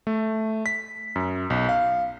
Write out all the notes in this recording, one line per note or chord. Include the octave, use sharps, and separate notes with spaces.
A3
B6
F#2
B1
F5